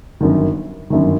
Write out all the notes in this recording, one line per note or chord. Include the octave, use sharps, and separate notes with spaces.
G1 F#2 D#3
G1 F#2 D#3